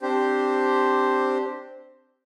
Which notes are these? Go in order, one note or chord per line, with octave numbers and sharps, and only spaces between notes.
C4 D4 G4 C5